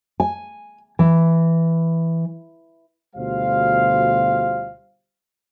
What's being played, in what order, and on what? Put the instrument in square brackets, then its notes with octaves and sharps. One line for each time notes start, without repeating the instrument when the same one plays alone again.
[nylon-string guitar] G#5
E3
[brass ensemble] D2 B2 G3 F4 C5 F5